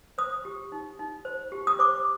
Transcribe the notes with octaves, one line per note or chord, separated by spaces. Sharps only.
C5 D#6
G4
D#4
D#4
C5
G4
D#6
C5 D6